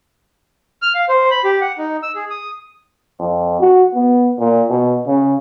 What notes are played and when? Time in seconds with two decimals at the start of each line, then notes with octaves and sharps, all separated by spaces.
0.82 F6
0.95 F5
1.09 C5
1.31 B5
1.44 G4
1.61 F#5
1.78 D#4
2.03 E6
2.15 G#4
2.30 D#6
3.19 F2
3.60 F#4
3.94 B3
4.39 A#2
4.70 B2
5.07 C#3